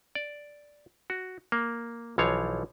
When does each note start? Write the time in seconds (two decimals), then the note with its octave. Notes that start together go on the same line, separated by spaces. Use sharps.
0.15 D5
1.10 F#4
1.52 A#3
2.18 B1 E3 F3 C#5 F5